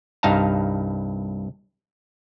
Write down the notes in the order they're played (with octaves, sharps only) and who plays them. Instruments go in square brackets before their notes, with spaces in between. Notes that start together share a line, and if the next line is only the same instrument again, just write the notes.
[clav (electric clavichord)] C2 G2 D#4 F5 A5 A#5